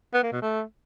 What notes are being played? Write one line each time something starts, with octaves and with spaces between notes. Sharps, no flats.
B3
A#3
B2
A3